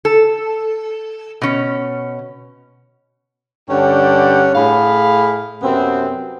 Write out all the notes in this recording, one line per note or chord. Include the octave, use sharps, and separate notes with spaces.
A4
B2 C#4
G2 D3 C#4 D4 F#5 G5
A2 G#4 F5 B5
F#2 C3 B3 C4